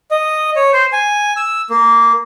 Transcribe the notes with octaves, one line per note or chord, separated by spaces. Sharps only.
D#5
C#5
C5
G#5
E6
A#3